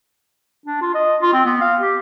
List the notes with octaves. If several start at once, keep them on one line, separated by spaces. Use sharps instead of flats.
D4
F4
D#5
F4
C4
B3
F5
G4